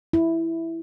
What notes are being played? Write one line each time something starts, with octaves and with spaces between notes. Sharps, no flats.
E4